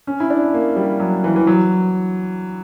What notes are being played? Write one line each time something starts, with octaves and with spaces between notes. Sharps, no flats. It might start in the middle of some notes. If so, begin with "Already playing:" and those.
C#4
E4
D4
A#3
G3
F#3
E3
E3
F#3